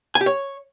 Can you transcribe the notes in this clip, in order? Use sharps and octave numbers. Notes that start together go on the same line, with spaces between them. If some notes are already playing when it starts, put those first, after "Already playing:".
G#5
G4
C#5